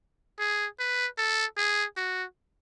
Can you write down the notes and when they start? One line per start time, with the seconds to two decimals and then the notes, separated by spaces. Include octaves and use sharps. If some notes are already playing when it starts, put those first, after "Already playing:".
0.39 G#4
0.79 B4
1.18 A4
1.57 G#4
1.97 F#4